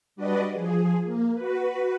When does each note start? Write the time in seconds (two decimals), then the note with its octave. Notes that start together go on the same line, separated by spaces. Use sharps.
0.16 G3 D4 F#4 B4 D5 D#5
0.53 F3 G#4
1.04 A#3
1.35 F#4 B4